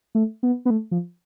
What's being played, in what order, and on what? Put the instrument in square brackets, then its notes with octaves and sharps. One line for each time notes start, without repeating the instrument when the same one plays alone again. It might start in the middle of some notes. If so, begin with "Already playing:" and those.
[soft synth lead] A3
B3
B3
A3
F3